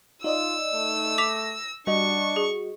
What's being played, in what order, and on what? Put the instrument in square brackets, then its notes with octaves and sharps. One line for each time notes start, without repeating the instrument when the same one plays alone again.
[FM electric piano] D#4 D5 D#5 [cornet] F4 [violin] E6
[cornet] A3
[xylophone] D6 B6 F7 [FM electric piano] A#6
[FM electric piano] G3 F#4 D#5 [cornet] D4 [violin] C#6
[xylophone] G#4